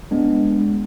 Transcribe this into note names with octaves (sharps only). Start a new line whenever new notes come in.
G#3 B3 D4